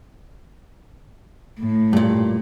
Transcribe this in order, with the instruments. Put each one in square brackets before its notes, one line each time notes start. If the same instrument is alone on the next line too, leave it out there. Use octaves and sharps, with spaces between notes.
[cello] A2
[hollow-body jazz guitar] G2 A#2